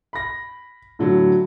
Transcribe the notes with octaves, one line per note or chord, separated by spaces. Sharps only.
B5 A#6
A2 D3 F#3